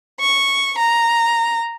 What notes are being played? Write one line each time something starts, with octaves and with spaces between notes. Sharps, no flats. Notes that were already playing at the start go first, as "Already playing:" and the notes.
C#6
A#5